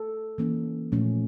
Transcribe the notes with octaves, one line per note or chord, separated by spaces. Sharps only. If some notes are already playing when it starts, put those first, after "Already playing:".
Already playing: A4
E3 A#3 C#4
A#2 F3 A3 C#4